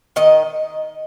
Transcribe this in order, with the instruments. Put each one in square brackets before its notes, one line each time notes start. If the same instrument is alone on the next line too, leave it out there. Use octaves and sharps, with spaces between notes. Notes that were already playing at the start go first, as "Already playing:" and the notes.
[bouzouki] D#3 D#5